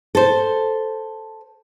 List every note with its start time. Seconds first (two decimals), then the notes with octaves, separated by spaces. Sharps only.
0.15 A4 C5